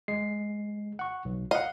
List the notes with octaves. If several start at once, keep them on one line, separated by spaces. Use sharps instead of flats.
G#3 C7
F#5 C#6
B1
D#5 F5 F#5